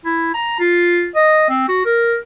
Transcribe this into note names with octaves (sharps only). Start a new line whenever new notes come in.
E4
A#5
F4
D#5
C4
F#4
A#4